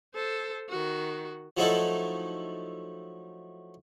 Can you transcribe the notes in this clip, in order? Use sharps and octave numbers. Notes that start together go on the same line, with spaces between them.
A4 C5
D#3 F#4
F3 F#3 A3 D#4 E4 A4